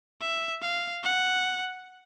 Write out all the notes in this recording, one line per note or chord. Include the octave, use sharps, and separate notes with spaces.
E5
F5
F#5